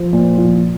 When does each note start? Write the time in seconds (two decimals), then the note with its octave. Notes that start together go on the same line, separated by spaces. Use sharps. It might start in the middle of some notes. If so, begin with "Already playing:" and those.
Already playing: F3 C5
0.13 A#2
0.38 F3